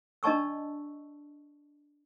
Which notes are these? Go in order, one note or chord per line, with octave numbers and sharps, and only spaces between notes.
D4 D5 D#5 A5 C#6 E6